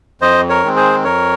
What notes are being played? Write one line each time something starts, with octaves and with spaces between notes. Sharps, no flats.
F2 C5 D#5
A#4 C#5
D#3 G#3 C4
G#4 C5
F2 A#4 C#5